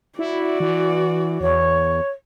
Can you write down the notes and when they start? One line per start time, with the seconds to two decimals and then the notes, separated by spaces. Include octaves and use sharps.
0.19 E4 F#4 D5
0.60 E3
1.41 E2 C#5